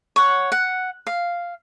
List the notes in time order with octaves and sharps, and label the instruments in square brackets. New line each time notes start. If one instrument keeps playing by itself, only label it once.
[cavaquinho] C#5 F#5
F#5
F5